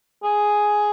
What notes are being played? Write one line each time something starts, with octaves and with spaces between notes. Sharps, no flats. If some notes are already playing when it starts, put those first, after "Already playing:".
G#4